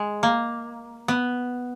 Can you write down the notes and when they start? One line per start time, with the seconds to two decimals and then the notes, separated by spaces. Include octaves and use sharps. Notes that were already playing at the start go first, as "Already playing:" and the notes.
Already playing: G#3
0.23 A#3
1.08 B3